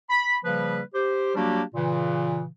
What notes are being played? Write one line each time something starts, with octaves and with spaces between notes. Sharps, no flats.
B5
C#3 F3 G3 A#3 B4
G4 C5
F#3 G3 A#3 D4 F#4 G4
A#2 C#3 E3